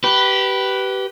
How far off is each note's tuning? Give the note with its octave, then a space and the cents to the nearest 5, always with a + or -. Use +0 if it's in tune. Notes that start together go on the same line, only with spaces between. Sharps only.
G4 -20 B4 +0